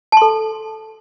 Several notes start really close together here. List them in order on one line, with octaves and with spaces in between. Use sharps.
A5 C6 A4